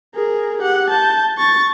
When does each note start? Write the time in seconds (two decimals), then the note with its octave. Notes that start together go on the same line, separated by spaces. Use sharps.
0.15 G#4 A#4
0.61 G4 F#5
0.90 A5 G6
1.38 C#6 A6